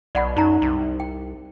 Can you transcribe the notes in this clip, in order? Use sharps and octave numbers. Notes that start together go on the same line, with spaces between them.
B1 D5 F#5 B5
F#2 D#4 A#5
C2
G5